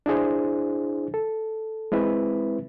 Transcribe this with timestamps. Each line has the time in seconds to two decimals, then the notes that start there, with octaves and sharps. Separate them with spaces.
0.06 D4 E4 G#4 C5
1.14 A4
1.92 G#3 C4 E4 B4 E5